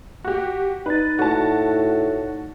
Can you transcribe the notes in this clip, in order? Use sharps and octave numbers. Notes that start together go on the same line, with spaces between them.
F#4 G4
D#4 B4 D5 A6
A2 F#4 A5